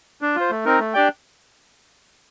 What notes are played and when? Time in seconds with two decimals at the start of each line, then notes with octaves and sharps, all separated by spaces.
0.22 D4
0.36 F4 C5
0.50 A3
0.65 C4 D#4 A#4
0.79 A3
0.94 D4 G4 D5 G5